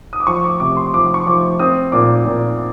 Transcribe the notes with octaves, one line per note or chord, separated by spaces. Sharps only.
D#6
D6
F3 C#6
D6
C3 D6
C6
F3 D6
C#6
F3 D6
C4 D#6
A#2 D6
A#2